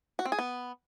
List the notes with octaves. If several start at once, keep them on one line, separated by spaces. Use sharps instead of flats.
F#4
C4
G#4
B3